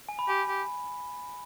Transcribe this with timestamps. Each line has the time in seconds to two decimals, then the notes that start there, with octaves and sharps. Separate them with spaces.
0.09 G#5
0.19 B5
0.28 G4 G#5
0.48 G4